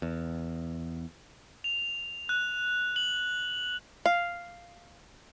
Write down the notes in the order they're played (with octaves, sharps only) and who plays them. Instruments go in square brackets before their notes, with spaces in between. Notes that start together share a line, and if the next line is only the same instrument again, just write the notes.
[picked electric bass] E2
[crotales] F7
F#6
F#7
[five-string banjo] F5